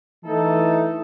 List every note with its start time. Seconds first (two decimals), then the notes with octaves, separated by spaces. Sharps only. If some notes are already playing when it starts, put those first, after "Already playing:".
0.24 E3 A3 D#4 A4